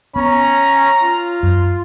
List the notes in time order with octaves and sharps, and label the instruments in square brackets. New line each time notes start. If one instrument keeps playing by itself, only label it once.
[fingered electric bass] B3 [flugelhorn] C#4 [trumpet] A#5
[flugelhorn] F4
[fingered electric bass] F#2